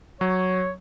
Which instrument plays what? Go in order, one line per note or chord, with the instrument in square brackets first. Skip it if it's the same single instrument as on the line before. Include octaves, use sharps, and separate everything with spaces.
[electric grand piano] F#3 [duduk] C#5